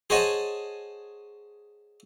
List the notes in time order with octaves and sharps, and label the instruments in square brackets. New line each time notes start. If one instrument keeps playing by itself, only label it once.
[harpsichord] G#4 C5 C#5 D#5 F#5 A5